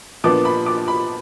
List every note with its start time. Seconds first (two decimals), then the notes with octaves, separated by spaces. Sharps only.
0.24 A#2 F3 B3 D4 D6
0.45 B5
0.66 D6
0.88 B5